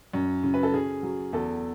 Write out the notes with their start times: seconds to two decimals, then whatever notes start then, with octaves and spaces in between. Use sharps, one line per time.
0.13 F#2
0.43 C#3
0.54 B4
0.63 A4
0.74 C#3 G#4
1.03 F#3
1.33 E2 A4